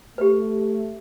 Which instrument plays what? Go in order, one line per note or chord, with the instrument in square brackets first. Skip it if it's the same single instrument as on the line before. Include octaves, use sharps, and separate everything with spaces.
[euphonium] A3 [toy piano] G4 B4